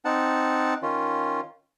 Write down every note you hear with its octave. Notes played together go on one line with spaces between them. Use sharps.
C4 D#4 F#5 A5
D#3 C#4 F4